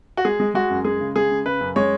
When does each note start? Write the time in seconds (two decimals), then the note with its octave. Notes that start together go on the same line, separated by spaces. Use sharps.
0.17 F#4
0.25 G#3 G#4
0.40 G#3
0.55 G#3 F#4
0.70 F#2
0.85 G#3 G#4
1.00 C#3
1.16 G#3 G#4
1.31 C#3
1.46 C#3 B4
1.61 F#2
1.76 G#3 C#5